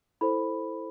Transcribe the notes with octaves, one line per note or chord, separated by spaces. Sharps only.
E4 A4 C5 B5